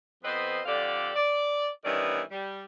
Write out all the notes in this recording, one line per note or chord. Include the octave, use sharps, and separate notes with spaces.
F2 B3 C4 B4 C5 D#5
F2 D3 G4 A4 D5 F5
D5
G2 D#3 E3 B3 C#4 D5
G3